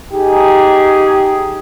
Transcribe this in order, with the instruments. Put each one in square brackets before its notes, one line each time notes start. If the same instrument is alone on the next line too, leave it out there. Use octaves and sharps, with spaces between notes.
[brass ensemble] D#4 G4 G#4